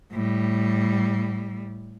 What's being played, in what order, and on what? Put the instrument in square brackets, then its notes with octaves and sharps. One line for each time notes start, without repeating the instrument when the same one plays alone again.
[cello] A2 G3